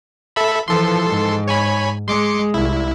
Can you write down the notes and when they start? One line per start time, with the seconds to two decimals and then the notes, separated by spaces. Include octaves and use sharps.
0.36 A4 E5 B5
0.68 E3 F3 A4 C6
1.06 G#2
1.48 C#5 G#5 B5
2.08 G#3 C6 D6 C#7
2.54 C2 E4